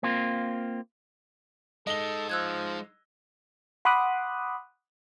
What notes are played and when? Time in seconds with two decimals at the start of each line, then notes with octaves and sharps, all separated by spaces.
0.03 A#3 C4 F4
1.87 G#3 D#4 A4 D#5 G7
2.30 F3 E6 F#6 G#6
3.85 F#5 B5 C6 D6 D#6 F#6